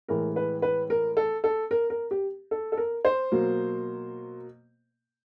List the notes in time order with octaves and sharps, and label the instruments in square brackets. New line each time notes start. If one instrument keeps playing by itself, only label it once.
[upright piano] A2 E3 G#3 A#4
B4
B4
A#4
A4
A4
A#4
A#4
G4
A4
A4
A#4
C5
B2 F#3 A#3